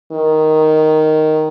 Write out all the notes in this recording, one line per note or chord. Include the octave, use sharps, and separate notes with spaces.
D#3